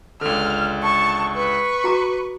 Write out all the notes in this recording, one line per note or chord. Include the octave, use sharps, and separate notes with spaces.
C#2 D3 A4 F6
A5 C#6
B4 C#6
F#4 A#5 D6